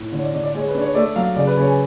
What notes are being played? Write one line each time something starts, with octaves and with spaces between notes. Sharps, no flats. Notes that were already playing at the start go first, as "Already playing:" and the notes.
Already playing: A2
D3 C#5
D5
D3 D5
D5
G#3 C#5
B4
D4
C#5
A3 D5
F#3 F5
C#3 D5
B4
C#3 C#5
G#5